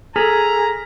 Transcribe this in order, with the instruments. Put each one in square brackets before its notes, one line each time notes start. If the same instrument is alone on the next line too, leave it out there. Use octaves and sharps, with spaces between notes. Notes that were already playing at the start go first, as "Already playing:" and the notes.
[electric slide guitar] G#4 [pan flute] A4 [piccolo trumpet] A#5 [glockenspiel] F6 B6 F7